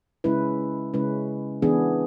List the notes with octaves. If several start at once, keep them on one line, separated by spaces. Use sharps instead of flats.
C#3 G#3 C#4 E4 B4
C#3 G#3 C#4 E4 B4
E3 B3 D4 G#4